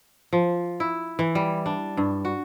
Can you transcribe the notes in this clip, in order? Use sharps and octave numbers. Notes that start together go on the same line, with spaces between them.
F3
E4
E3
G3
D4
G2
F#4